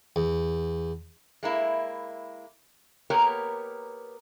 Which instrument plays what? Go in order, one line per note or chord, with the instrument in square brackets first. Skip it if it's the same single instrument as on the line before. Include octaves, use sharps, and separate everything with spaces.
[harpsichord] E2
[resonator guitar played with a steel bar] G#3 A#3 E4
A#3 B3 G4 A#4 C#5